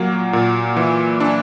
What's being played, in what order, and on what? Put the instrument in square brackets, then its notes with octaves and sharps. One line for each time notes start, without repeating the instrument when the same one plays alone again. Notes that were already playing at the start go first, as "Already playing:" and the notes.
Already playing: [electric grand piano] A#2 F#3 A#3
A#2
E3
D4